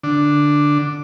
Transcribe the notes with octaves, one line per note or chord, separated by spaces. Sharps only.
D3 D4